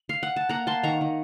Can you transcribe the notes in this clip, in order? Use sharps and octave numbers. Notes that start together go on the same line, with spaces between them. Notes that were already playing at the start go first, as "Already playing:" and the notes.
Already playing: D#5
F5
F#5
A5
A#3 F#5 A#5
A#3 A5 C6
D#3 A#5 C#6
D#3